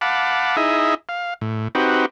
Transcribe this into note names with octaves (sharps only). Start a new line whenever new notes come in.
F5 F#5 A5 B5 D6
D#4 E4 G#4 D#5 E5
F5
A2
C4 D#4 F#4 G4 B4